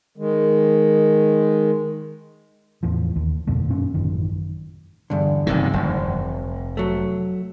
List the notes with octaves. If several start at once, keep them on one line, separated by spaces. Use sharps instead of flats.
D#3 G#3
E2 A2 F3
D#2
G1 F2 B2 A3
F#2 A#2 C#4
A1 F#2 D#3
E2 G2 D3
F#1 C3 D#3
F1
F#3 A3